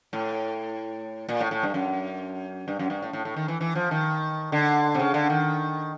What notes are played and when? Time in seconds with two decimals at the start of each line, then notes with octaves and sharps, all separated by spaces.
0.13 A2
1.29 A#2
1.40 A2
1.51 A2
1.63 G2
1.74 F#2
2.68 G2
2.79 F#2
2.90 G2
3.02 A2
3.13 A2
3.25 A2
3.36 D#3
3.48 E3
3.61 E3
3.75 F3
3.91 D#3
4.52 D3
4.95 C3
4.99 C#3
5.14 D3
5.30 D#3